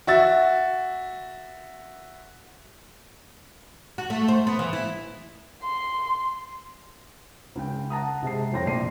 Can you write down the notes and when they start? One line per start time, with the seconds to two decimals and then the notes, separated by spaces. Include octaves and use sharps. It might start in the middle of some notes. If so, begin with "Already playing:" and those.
0.07 F#4 E5 A6
3.98 F#4
4.10 A3
4.28 C5
4.47 B3
4.59 E3
4.73 E4
5.63 C6
7.55 C#2 C#3 G5
7.90 F#5 A5 A#5 D#6
8.23 C3 G#3 A5 C7
8.52 C2 F2 C#5 G5 C6 A#6
8.66 F1 A#1 D5 C7 D#7